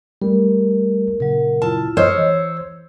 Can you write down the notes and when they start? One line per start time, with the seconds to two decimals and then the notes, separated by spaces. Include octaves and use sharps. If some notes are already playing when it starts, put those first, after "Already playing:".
0.22 G3 A3 A#4
1.20 A#2 C#3 F#3 A#4
1.62 E4 F4 A5
1.97 C5 C#5 D#5 E6 F6
2.18 E3